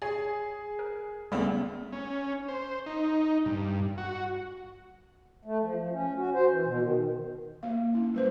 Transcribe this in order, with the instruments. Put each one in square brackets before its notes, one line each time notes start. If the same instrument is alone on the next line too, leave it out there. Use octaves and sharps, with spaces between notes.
[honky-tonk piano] G#4 [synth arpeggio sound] C#5 G#5
[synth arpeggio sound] A#4
[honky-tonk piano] D2 C#3 [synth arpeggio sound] G3 A3 B3
[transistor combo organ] C#4
C5
D#4
G2
F#4
[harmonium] A3
F3
F3
C#4
F#4
C5
E3
B2
D#3
[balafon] A#3 F5
C#4 E4
G3 B4 C5